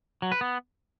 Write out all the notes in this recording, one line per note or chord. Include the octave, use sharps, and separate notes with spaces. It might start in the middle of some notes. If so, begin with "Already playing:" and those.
F#3
B4
B3